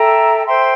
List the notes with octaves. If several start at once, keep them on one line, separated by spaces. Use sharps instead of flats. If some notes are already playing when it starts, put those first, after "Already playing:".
Already playing: A4 E5 G5 A#5
C5 E5 G5 C6